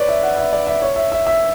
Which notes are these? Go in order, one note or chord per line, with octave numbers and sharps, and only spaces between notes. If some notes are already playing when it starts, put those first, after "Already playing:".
Already playing: B4 C#5 D5
E5
F#5
E5
D5
E5
C#5
E5
E5
E5